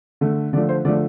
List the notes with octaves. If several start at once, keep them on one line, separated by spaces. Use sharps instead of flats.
D3 A3
D3 F3 A3 D5
C5
D3 F3 A3 D5